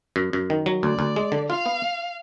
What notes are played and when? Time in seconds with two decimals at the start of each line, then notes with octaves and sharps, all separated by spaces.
0.16 F#2
0.33 F#2
0.50 D#3
0.66 F#3
0.83 D2 D5
0.99 D2
1.16 G#3
1.32 D3
1.49 F4 F5
1.66 B3